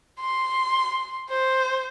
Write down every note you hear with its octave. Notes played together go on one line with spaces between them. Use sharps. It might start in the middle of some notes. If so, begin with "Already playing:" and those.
C6
C5